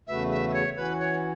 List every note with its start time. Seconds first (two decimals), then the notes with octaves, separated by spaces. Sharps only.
0.07 E2 C#3 A3 F#4 B4 E5
0.30 E5
0.49 E5
0.54 C#5
0.76 E3 C#4 F#4 B4
1.00 C#5